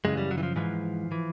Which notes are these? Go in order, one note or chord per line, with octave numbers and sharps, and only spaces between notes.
F#2 C#3 E3 G#3
G3
F#3
E3
F3
G#2 E3 F3
E3